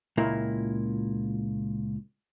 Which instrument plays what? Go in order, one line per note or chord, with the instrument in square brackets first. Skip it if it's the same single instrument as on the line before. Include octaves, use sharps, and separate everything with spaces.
[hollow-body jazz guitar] C#2 A#2 A#3 E4